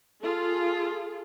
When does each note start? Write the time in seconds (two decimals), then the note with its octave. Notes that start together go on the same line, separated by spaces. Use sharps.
0.22 F4 G#4 A4